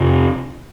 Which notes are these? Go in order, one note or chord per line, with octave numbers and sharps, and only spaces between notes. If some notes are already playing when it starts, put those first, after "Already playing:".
Already playing: F2 C3